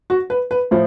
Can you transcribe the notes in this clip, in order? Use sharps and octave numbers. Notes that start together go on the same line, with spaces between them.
F#4
B4
B4
A2 F3